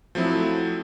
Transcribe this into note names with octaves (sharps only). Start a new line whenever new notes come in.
F3 F#3 A3 C4 E4